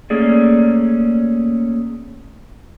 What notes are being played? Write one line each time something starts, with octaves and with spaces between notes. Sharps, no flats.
A3 A#3 C#4 G#4 D5